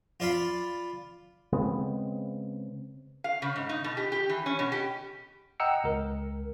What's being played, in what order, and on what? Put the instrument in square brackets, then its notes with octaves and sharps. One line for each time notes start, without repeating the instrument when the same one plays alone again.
[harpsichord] F4 D5 F5 B5
[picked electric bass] C#3 G#3 B3 C4
[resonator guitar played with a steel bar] F5
C#3
G#2
D#4
B2
G4
G4
E3
C#4
B2
G4
[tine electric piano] D#5 F#5 G5 A#5 E6 C#7
C#2 A#4